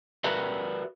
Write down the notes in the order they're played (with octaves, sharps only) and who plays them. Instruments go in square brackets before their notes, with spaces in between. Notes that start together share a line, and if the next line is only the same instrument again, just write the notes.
[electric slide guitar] F#4 A#4 B4 D5 E5